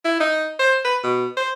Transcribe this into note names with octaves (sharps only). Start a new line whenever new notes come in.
E4
D#4
C5
B4
B2
C5